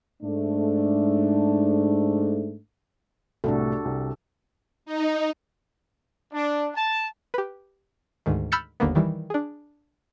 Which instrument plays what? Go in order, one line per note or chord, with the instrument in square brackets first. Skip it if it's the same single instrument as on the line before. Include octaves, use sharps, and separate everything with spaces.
[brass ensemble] G#2 A3 D4
[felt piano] C2 A2 G3 [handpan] D4 F#4 A4
[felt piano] C2
[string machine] D#4
[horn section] D4
A5
[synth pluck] G4 B4
D2 G#2 D#3
B5 E6 F6 G6 A6 C#7
G1 D#2 D3 A#3 B3
D#3 E3 G3
D4 G#4